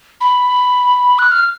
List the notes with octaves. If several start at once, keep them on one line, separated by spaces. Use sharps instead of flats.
B5
F#6
F6